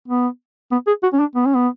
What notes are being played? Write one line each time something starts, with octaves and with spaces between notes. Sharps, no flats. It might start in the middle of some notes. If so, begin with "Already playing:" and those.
B3
B3
G#4
F#4
C#4
D4
B3
C#4
B3